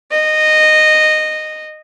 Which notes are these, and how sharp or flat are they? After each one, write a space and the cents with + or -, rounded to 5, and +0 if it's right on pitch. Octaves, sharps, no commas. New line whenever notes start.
D#5 -15